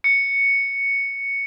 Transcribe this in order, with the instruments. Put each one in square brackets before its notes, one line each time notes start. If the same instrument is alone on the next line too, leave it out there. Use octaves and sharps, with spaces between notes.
[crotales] C#7